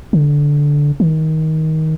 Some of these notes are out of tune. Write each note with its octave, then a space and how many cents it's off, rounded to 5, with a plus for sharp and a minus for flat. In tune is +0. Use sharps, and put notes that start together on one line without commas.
D3 -10
D#3 +20